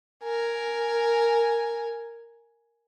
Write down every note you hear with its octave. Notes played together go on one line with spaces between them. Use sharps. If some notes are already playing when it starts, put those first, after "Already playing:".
A#4 G#5